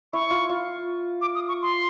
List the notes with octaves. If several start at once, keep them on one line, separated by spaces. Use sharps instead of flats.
E4 C#6
F4
F4
D6
D#6
C#6
C6